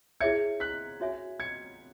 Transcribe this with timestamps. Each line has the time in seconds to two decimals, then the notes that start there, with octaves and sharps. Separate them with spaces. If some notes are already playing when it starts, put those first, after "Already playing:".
0.20 E4 G#4 C#5 E5 G#6 C#7
0.60 F#6 B6
1.00 C#4 F#4 C#5 E5 G#5
1.40 G#6 C#7